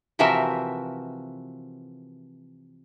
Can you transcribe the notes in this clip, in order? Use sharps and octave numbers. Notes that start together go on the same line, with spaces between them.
C3 E3 F3 F#4 A#4 E5